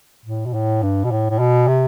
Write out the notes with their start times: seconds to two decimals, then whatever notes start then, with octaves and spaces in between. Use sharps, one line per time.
0.26 A2
0.46 B2
0.54 A2
0.83 G2
1.05 B2
1.11 A2
1.30 A2
1.39 B2
1.67 C3